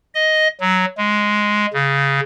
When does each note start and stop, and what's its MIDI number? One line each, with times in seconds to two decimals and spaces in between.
0.15 0.48 75
0.61 0.86 54
0.98 1.66 56
1.73 2.20 49